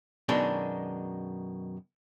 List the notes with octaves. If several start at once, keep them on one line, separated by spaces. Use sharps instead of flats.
F#2 B2 D#3 G#3 D4